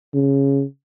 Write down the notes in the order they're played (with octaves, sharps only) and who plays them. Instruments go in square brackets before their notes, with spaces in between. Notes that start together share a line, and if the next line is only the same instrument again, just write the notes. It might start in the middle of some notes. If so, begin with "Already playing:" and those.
[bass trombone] C#3